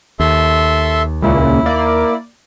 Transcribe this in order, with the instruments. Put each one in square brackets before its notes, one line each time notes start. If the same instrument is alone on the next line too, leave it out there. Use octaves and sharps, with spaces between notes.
[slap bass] D#2 [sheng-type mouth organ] A4 E5 C6
[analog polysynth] C#2 A#2 C#3 [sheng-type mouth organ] E4
[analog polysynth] A#3 D5